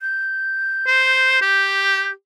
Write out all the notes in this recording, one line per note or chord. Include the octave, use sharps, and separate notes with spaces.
G6
C5
G4